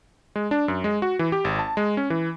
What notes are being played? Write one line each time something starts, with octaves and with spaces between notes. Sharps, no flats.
G#3
D4
F#2
G#3
F#4
E3
G4
G#1
A5
G#3
C#4
E3